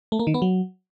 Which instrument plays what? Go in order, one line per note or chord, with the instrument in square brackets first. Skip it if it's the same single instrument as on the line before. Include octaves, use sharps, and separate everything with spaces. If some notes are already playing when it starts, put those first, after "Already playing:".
[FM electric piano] A3
A#3
D#3
B3
F#3